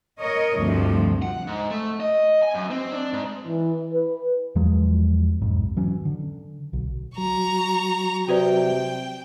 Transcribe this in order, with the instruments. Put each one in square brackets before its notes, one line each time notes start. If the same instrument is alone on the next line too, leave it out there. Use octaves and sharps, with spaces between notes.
[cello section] A#4 C#5 D#5
D2 G2 C3 F3
[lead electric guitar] F#5
G#2
A3
D#5
G#5
F#2
C4
D4
G#2
[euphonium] E3
B4
[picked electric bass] E2 F3 F#3 G#3
B1 F2 G#2
E3 F#3 C#4
D3
B1
[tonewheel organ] F#3 [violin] A#5 C#6
[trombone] C3 [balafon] F#4 B4 D5 [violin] G5